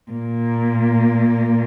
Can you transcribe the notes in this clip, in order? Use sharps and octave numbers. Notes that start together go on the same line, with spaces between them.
A#2 A#3